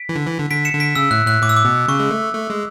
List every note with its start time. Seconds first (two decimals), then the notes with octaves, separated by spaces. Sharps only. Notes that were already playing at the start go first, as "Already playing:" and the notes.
Already playing: B6 D7
0.09 E3
0.16 D3
0.27 E3
0.39 D3
0.50 D3 B6 D7
0.65 C#7 E7
0.73 D3
0.80 B6 D7
0.95 C#3 E6
1.11 A2 F#6
1.26 A2 F#6
1.42 A2 D6
1.49 E6
1.57 D6
1.65 B2
1.88 C#3 C#6
1.99 G#3
2.11 A3
2.34 A3
2.50 G#3